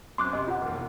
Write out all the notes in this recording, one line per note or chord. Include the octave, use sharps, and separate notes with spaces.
F#2 C4 C6 D6 F#6
C3 D#5
F4 F#5
E1 D#2 B4